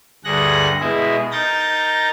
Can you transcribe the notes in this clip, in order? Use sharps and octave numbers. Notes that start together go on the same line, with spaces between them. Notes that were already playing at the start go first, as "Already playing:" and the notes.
D2 G2 G#4 F#5 F#6 A#6
B2 G#3 E4 G#4
D#4 A#4 G6 A6 A#6